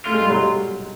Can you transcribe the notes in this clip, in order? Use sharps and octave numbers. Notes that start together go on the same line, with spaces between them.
A3 F4
G#3
G3
F#3 G#3